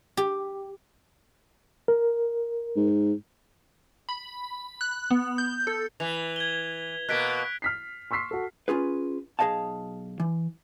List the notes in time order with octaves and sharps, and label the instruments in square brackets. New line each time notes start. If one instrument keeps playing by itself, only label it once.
[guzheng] G4
[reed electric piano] A#4
[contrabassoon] G#2
[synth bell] B5
F#6
B3
G6
A4
[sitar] E3 [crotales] F7
[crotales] G#6 G7
[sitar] B2 A#3 [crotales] F#6 B6 D7
[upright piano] F6 B6 C7
C6 C#6 E6 B6 C7
F#4 A4
[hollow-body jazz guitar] C#4 F4 G#4 B4
B1 G#4 C5 D#5 F5 A5
E3